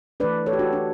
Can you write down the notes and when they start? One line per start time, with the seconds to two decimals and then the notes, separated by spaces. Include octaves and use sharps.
0.20 E3 A3 D4 B4 D5
0.46 A4 C#5
0.53 G4
0.59 D4 F#4
0.73 D4